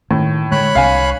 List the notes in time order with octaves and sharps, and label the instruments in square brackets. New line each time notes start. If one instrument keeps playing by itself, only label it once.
[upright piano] A2 [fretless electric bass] D#3
[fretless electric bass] D3 G#3 [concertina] C#5 B5 F#6
[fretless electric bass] C2 C3 D4 [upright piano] F5 G#5